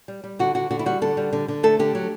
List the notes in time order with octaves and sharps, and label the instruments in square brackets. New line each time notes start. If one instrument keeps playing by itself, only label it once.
[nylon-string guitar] G3
G3
D3 F#4
D3 F#4
D3 F#4
E4
G3 F#4
D3 A4
G3
D3
D3
A3 A4
D3 G4
F#3